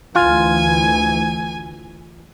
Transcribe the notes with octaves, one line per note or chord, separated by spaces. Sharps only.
D2 E3 F4 G#5